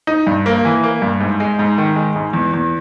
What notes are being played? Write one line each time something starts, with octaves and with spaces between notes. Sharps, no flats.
D#4
G2
A#3
E3
A#3
G2
G#2
G#3
G#2
D#3
G#3
G#2
E2
E2